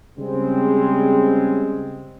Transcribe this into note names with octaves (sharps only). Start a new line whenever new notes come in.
C#3 G3 G#3 C4